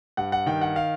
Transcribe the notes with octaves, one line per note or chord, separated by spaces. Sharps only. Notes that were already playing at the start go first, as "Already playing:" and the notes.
G2 F#5
F#5
D#3 G5
F#5
F5